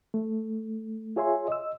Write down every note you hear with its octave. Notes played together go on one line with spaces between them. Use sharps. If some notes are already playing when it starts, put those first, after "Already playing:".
A3
F4 G#4 C#5 E5 G#5 C6
D#5 E6